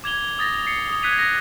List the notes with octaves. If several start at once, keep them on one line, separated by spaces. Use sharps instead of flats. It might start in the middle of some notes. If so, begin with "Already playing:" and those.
D6 G#6 F7 G7
D#6 A6 A#6
C7 C#7
D#6
F#6 G#6 B6 D#7 F7
A#6